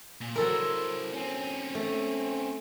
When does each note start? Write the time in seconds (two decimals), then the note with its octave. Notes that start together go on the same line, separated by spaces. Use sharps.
0.21 A#2
0.35 F#3 E4 A4 A#4 C5
1.13 C4 C#4
1.75 A3